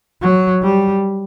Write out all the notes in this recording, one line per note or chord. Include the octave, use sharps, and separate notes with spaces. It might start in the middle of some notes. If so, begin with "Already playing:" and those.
F#3
G3